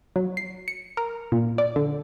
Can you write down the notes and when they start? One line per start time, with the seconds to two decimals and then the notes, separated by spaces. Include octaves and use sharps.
0.16 F#3
0.37 C7
0.68 C#7
0.97 A#4
1.32 A#2
1.58 D5
1.76 D3